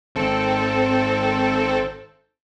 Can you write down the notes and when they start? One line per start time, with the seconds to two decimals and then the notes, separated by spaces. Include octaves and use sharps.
0.15 G#1 C4 A4